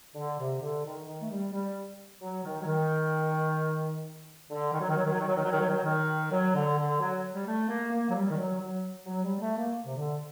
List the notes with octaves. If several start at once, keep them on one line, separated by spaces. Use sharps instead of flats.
D3
C3
D3
D#3
D#3
A3
G3
G3
F#3
D#3
F#3
D#3
D3
D#3
F#3
D#3
F#3
D#3
F#3
D#3
F#3
D#3
F#3
D#3
F#3
D#3
F#3
D#3
F#3
D3
D3
F#3
G3
A3
A#3
A#3
F#3
G3
D#3
F#3
F#3
F#3
G3
A3
A#3
C3
D3